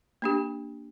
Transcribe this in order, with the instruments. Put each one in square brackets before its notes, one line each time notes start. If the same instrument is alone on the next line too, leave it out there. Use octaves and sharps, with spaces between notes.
[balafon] A#3 D4 G4